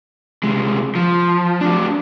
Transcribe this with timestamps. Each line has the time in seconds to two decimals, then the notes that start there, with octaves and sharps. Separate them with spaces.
0.43 C2 G#3
0.95 F3
1.61 F#3 D4